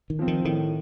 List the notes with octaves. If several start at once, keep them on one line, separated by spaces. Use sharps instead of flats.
D#3
F3 C4
D#3
A2 D#3